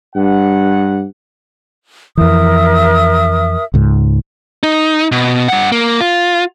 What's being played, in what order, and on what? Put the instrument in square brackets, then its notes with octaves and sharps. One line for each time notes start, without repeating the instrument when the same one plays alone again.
[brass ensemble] G2 F#5
[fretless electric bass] F2 E3 [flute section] A#4 E5 D#6
[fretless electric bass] C#2 G#2
[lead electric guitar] D#4
B2
G2 F#5
A#3
F4